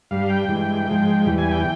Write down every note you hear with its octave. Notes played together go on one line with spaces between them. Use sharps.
G2 G3 F5
G5
G2 E3 G#3
G#2 F3 G#3
E2 E3 G3
G#5
G5